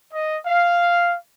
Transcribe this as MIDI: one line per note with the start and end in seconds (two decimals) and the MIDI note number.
0.12 0.38 75
0.46 1.15 77